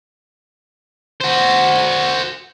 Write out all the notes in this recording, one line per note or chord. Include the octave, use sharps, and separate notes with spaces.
F#4 C5